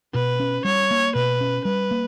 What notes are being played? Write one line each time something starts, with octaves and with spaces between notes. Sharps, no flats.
B2 B4
C#4
G3 C#5
A#3
B2 B4
C#4
G3 B4
A#3